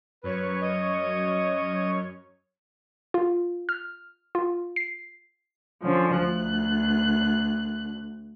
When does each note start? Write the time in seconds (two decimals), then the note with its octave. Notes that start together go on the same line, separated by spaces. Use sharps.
0.23 F#2 B4 C#5 C#6
0.62 D#5
3.14 F4
3.69 F6
4.35 F4
4.76 C7
5.83 D3 F3 C#4
6.19 D2 F#6